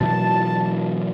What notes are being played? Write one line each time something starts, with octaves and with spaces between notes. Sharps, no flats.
B2 E3 F#3 A5